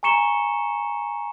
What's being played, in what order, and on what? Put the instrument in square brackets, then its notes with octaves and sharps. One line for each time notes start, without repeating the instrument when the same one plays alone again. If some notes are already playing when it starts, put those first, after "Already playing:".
[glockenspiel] G#5 A#5 C#6 C#7 E7 G7